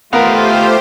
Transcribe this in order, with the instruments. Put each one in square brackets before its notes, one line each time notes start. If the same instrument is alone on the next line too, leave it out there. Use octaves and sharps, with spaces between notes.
[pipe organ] A3 F4 [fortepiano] B3 A#4 [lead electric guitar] D#4 F5 [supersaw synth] G4 C5